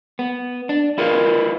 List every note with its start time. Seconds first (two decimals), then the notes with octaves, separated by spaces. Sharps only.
0.19 B3
0.69 D4
0.98 E4 F4 A#4 B4 F5